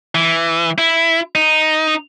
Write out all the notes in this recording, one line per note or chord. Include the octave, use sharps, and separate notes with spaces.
E3
E4
D#4